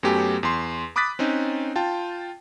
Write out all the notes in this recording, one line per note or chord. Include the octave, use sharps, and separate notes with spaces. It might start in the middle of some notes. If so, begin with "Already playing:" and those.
F#2 F#3 A3 B3 G4 G#5
E2 C6
B5 D6 D#6 F#6 A6 B6
C4 C#4 D#4
F4 G5 A5